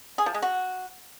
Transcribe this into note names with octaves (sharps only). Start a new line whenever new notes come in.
G#4
F3
G#3
F#4